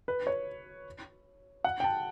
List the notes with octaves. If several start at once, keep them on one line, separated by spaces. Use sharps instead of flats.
B4
C#5
F#5
G5
A5